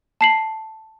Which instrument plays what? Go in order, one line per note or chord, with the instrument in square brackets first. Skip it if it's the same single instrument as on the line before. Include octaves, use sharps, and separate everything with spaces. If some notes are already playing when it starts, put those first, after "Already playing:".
[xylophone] A5 C7 F#7